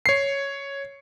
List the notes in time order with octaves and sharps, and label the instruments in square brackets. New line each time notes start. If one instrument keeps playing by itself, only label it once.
[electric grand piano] C#5 C7